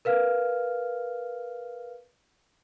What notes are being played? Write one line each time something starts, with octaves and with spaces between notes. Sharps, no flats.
A#4 B4 F5 F6